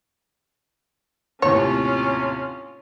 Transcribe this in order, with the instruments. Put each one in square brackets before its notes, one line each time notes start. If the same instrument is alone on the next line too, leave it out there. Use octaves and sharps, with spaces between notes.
[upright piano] D#2 A2 C3 [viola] C#4 F4 [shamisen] C#5